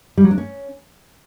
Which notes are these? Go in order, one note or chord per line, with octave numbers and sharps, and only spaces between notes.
G3
F#3
D4
C#4